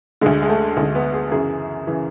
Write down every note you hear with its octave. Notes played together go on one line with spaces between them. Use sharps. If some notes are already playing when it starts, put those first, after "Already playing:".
D2 D3 G#3
G#3
A3
D2 D3 G#3
B3
G#4
F#2 C#3 E3 G#4
C#3 E3